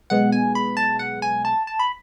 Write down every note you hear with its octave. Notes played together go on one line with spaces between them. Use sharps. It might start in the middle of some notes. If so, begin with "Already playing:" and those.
B1 B2 G#3 B3 F#5
G#5
B5
A5
F#5
G#5
A5
A5
B5